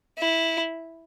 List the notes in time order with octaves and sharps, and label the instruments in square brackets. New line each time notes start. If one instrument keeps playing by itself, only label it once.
[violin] E4